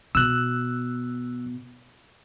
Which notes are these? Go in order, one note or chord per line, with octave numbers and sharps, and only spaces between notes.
B2 E6 F#6